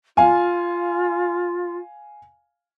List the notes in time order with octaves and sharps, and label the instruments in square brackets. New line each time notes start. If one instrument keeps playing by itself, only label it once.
[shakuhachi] F4 [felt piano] F5 G#5